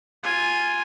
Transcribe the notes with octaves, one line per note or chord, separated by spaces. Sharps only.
F4 G#5